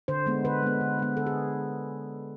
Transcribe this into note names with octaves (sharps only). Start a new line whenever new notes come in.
D3 C5
G#3 B3
D3 B4
G#3 B3
D3
G#3 B3
D3 A4
G#4